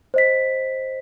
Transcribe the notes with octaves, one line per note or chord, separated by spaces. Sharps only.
C5 D#5 B6